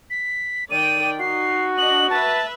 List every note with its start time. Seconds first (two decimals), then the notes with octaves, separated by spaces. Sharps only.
0.10 B6
0.71 D#3 D5 G5 D#7
1.20 D#4 F#4 C7
1.78 D4 D#5 F#7
2.10 B4 E5 A5